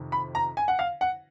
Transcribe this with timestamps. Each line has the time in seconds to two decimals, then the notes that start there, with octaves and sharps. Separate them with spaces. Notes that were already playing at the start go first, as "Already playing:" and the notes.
Already playing: F2 C3 D#3
0.12 B5
0.35 A#5
0.57 G#5
0.68 F#5
0.79 F5
1.01 F#5